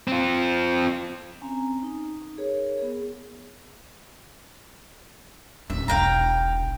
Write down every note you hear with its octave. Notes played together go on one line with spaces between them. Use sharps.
C4 F4
C4 C#4 G#5 A#5
D#4
G#4 A#4 C#5
B3 G#4
D#1 D#3 E5
E1 B1 F5 G5 A#5